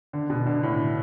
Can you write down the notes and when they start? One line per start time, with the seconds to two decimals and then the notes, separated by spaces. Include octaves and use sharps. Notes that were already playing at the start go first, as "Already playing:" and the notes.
0.13 D3
0.30 B2
0.46 D3
0.63 A2